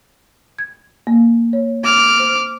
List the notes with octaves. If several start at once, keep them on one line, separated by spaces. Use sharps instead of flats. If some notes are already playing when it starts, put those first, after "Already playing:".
G#6
A#3
C#5
D6 F6
C5